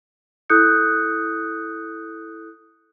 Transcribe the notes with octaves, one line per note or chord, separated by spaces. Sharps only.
E4 A4 D#6 F#6 G6 C#7